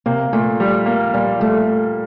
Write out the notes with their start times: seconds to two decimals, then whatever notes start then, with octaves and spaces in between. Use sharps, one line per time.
0.06 C3 A#3
0.33 A#2 A3
0.60 G3
0.86 A#3
1.14 A#2 G3
1.40 G3 A3